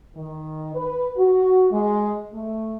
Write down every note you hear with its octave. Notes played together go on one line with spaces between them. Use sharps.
D#3
B4
F#4
G#3
A3